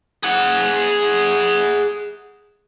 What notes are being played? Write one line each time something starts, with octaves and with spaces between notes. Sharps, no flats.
G#4 F#5